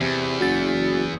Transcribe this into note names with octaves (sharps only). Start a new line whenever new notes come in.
E2 C3
F#1 F#4 A6